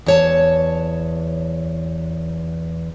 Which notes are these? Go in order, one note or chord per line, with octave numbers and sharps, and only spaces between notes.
E2 C#5 A5